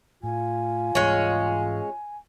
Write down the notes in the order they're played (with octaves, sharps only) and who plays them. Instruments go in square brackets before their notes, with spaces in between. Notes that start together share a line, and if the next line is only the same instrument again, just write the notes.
[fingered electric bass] A2 [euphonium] F4 [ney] G#5
[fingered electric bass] G#2 E3 G3 [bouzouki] G#3 C#4